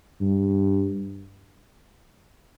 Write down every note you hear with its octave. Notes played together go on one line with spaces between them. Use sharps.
G2